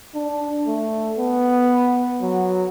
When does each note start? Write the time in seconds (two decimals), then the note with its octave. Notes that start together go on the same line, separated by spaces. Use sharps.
0.15 D4
0.67 A3
1.19 B3
2.22 F#3